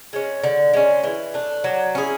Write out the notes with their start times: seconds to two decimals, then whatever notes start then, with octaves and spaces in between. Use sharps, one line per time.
0.13 G#3 C#4
0.44 D3
0.73 G#3 C#4
1.04 E3
1.34 A3 D4
1.64 F#3
1.95 C#4 E4 G#4